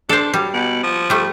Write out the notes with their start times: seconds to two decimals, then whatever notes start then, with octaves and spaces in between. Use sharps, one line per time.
0.09 D4 A4 C5
0.34 F#3 G3
0.54 B2
0.83 F3
1.10 G3 A3